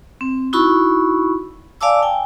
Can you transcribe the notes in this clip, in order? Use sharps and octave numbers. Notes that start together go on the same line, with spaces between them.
C4
D#4 E4 F#4 B5 C#6
D5 F5 G#5 A5 D6 E6
G5 G#5